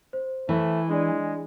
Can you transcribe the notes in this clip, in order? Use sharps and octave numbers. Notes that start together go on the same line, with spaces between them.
C5
E3 A3
G#3 D4 D5